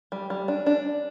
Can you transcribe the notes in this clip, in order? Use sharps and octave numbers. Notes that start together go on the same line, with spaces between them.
G3
G3
D4
D4